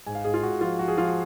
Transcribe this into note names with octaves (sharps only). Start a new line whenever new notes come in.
G#2 G#5
F5
G#2 G#4
F4
G#2 F#4
F3 F4
F3 F#4
G#4
F3 F4
F#4